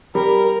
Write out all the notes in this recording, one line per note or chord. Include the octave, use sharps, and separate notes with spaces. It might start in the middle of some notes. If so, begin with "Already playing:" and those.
G3 A#4